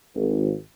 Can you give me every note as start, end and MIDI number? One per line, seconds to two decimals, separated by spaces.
0.15 0.52 32